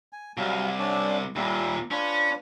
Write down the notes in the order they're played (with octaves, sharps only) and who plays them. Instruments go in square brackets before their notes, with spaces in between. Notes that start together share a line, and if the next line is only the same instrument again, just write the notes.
[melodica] G#5
[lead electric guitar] C2 [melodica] F#3 G3 F5
[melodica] C#4 D4 D5
[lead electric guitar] D#2 A#2 [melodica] G3 E4
[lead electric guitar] C#4 [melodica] D4 F4 B4